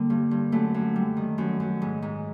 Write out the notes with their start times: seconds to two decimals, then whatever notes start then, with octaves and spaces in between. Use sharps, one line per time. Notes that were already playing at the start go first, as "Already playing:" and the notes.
Already playing: D3 G3 A#3
0.10 G2
0.31 G2
0.52 F#2 A3
0.74 F#2
0.96 G3
1.17 D#3
1.38 F#2
1.60 F#2
1.82 G#2
2.02 G#2